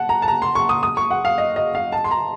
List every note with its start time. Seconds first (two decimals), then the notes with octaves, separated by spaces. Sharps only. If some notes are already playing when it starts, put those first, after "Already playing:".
Already playing: F#5 A5
0.09 A#5
0.22 A5
0.28 A#5
0.42 C6
0.55 C#6
0.69 D#6
0.83 D#6
0.97 C#6
1.11 F#5
1.25 F5
1.38 D#5
1.56 D#5
1.75 F5
1.92 A5
2.04 C6
2.11 A#5